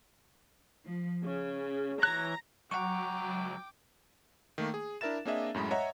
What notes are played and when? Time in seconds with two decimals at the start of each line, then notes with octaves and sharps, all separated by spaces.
0.85 F3
1.25 C#3
2.03 E3 C#5 A#5 F#6
2.71 C#2 F#3 F#5 G5 A#5 C#6 D6
4.58 D#3 A3 A#3
4.74 G#4
5.01 D4 E4 A#4 E5 A6 E7
5.25 A#3 C4 D4 G#4 D#5 E5
5.54 F#2 A2 G#3 B5
5.71 C#5 D#5 E5 F#5 A#5